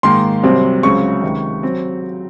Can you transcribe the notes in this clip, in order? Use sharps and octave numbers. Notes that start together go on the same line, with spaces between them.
G#2 D#3 A#3 C6
C2 C3 F#3 C4
C#2 C#3 F#3 C4 C#6
C#2 C3 D#3
F#3 C4